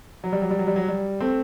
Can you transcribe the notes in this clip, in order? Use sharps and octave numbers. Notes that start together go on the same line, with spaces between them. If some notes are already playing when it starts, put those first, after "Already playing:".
F#3
G3
F#3
G3
F#3
G3
F#3
G3
A3 C4